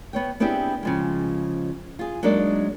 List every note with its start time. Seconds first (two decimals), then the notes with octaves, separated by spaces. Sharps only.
0.13 B3 C#5 G5
0.40 B3 C4 D4 E4 G4 G#4
0.83 C#3 F3 G#3
1.99 F4 G#4
2.23 F#3 G#3 A#3 D4 D#4 D5